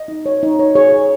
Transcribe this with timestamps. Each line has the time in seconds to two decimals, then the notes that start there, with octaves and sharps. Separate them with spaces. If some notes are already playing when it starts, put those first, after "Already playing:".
Already playing: D#5
0.08 D#4
0.26 C#5
0.43 D#4
0.59 C#5
0.75 G#4 C#5
0.93 G#4